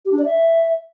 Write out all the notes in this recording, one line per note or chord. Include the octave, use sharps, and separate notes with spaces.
G4
D4
D5
E5